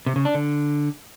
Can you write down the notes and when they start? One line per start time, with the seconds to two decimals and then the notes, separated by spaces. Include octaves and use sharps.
0.06 C3
0.16 C#3
0.25 D4
0.35 D3